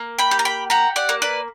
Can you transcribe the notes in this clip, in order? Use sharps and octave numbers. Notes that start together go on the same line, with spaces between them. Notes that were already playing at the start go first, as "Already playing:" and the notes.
Already playing: A#3
G5 B5
G4
A#5
G5 B5
G4 F#5 A#5
D5 F#5
A#3
B4 D5